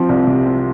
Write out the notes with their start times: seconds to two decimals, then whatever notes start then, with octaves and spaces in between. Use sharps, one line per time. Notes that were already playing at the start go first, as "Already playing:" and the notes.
Already playing: F3 C4
0.09 C2
0.27 C3
0.45 C4